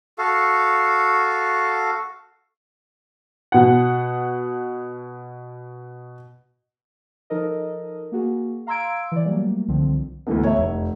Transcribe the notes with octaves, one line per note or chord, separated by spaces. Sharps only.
F#4 A4 F5
B2 F#5
F3 D#4 A4 A#4 D#5
A#3 F#4 G#4
F5 A#5 C6 E6 G#6 D7
E3 D5
F#3 G3 A3 A#3
C2 D3 D#3 F3 C4
D2 G#2 E3 A3 B3
C#5 E5
F1